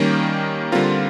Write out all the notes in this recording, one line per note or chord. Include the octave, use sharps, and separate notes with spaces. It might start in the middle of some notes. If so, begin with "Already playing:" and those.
Already playing: D#3 G3 A#3 C#4
D3 G3 C4 F4 A#4